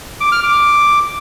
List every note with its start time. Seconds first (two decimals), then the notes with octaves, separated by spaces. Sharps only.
0.21 D6
0.32 F6
0.43 D6